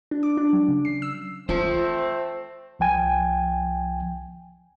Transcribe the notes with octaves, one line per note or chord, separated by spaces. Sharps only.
D4
D6
D4
F#3
C#3
C7
E6
A3 C4 F4 C5 A5
C2 F3 G5 G#5